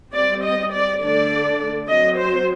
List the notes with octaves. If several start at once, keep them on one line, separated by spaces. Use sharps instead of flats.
G3 C4 D5
D#5
D5
D3 A3 D4 D5
F#3 C4 D#5
C5